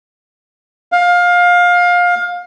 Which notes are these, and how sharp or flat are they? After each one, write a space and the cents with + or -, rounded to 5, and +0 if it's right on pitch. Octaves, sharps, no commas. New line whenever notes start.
F5 +20